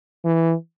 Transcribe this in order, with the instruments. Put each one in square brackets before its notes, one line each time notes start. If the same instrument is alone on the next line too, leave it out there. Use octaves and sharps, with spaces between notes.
[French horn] E3